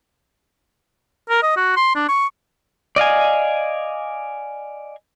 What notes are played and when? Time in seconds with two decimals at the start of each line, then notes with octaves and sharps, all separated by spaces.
1.30 A#4
1.43 D#5
1.57 F#4
1.76 C6
1.95 D4
2.09 C#6
2.96 D5 D#5 F5 G#5